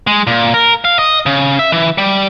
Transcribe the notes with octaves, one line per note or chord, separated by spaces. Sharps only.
G#3
A#2
A#4
F5
D#5
C#3
E5
E3
G3